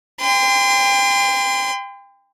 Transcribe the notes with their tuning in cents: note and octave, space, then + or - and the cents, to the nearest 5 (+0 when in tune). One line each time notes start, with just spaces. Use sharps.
G5 +30 C6 -35